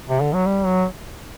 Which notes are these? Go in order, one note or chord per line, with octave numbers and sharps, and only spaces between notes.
C3
D3
F#3
G3
F#3